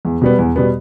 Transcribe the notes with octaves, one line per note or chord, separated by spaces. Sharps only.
E2
B2 G3 B3
E2
B2 G3 B3